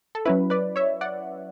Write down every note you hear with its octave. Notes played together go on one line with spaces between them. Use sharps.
A4
F#3 C#4 E4 B4
B4 D5
C#5 E5
D5 F#5